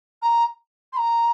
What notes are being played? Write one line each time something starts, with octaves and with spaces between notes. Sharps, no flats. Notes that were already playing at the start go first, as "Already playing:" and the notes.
A#5
C6
A#5